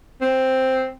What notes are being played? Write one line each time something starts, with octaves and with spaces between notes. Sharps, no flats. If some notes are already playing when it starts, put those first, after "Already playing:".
C4